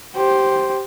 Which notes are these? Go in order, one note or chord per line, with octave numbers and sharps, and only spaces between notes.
G4 C5